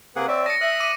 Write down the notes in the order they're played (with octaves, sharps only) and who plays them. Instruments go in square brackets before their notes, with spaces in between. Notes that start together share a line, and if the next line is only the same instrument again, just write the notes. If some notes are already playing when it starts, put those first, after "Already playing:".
[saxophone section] C3 B4 [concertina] A#3 G#4 F#5
[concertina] C4 E5 [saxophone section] C#5 D5
[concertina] A5 D#6 [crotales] A#6 C#7
[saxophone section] E5 [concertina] D#6 F#6
[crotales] D6 D#7